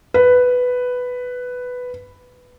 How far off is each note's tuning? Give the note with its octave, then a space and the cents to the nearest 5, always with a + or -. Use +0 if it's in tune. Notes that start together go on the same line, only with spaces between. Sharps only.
B4 +5